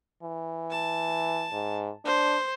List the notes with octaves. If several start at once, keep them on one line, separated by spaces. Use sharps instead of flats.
E3
A5
G#2
D4 C5